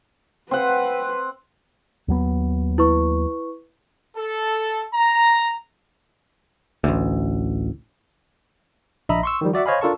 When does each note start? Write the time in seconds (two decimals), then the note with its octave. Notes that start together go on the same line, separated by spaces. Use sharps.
0.51 C4 B4 F#5
2.08 D#2 F#3 B3
2.78 E4 B4 C#6
4.17 A4
4.94 A#5
6.84 A1 D2
9.09 A#1 D4 D#5 E5 A#5 B5
9.23 C6 C#6 E6
9.41 D#3 F3 G3
9.53 F#4 D5 E5 F#5
9.66 C5 C#5 D#5 F5 G#5 B5
9.81 D4 F4 A4 A#4 A5 C#6